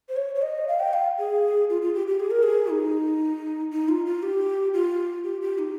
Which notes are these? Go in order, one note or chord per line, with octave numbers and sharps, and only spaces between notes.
C5
C#5
C#5
D#5
F5
G5
F5
G#4
F4
F4
G4
G4
G#4
A#4
G#4
D#4
D#4
F4
F4
G4
F4
G4
G4
D#4